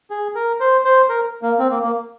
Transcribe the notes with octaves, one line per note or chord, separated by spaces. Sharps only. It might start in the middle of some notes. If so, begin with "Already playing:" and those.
G#4
A#4
C5
C5
A#4
A#3
C4
A#3
A#3